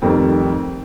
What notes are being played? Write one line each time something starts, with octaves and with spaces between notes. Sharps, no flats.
F1 F2 D#3 G3 C4